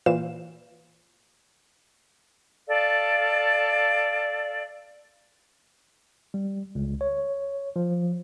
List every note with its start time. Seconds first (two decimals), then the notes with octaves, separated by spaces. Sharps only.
0.06 A#2 E3 C5 F5 E7
2.67 A4 D5 F5
6.34 G3
6.75 C#2
7.01 C#5
7.76 F3